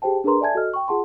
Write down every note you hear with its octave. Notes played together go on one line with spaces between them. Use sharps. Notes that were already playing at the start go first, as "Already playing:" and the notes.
G4 G#4 C5 G5 A5
D4 G#4 A#4 B4 A#5 C6
A4 D5 E5 G#5 A5 G#6
F#4 A4 D#5 F6
G5 C#6
F4 G#4 F#5 A5 C6